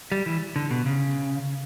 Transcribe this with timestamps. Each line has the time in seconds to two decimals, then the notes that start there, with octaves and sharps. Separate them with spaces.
0.12 G3
0.26 E3
0.56 D3
0.71 B2
0.86 C#3